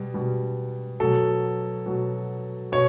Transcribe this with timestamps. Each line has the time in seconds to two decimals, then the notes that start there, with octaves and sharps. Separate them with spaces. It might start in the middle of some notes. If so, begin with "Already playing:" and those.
Already playing: B2 G3
0.14 B2 G3
1.00 B2 F#3 A4
1.86 B2 F#3
2.72 B2 C#5